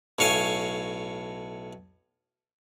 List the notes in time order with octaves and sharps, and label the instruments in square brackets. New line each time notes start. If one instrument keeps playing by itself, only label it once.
[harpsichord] B1 A2 C#5 F5 G#5